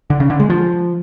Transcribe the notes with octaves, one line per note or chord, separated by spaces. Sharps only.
D3
C#3
D3
G#3
F3